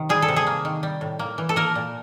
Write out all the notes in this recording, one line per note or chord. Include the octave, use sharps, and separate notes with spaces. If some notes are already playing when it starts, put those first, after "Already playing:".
Already playing: C3 D#3
G3 G#4
A4
C3
G#4
A#3
D#3
G3
A2
A#3
E3
A4
A#3 A#4
A#2